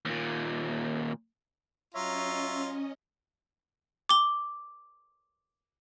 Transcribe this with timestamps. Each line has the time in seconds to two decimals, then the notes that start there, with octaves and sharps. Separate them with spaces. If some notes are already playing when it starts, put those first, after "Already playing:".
0.05 D#2 A#2
1.94 F#3 C#4 F4 C#5 D#5 E5 A#5
4.09 D6 G7